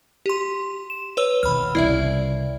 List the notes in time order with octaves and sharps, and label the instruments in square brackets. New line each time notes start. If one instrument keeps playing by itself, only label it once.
[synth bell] G4 C6
E7
B4 C#5 E6
[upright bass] D#2 B2 [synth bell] B5 F6
[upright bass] C2 C#3 [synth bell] E4 D5 E5